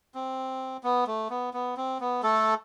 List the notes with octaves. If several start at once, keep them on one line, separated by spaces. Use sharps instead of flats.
C4
B3
A3
B3
B3
C4
B3
A3 A4